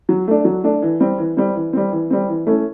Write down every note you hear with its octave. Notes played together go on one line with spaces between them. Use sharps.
F#3
A3 D4
F#3
A3 D4
E3
G3 C4
E3
G3 C4
E3
G3 C4
E3
G3 C4
E3
A3 C#4 E4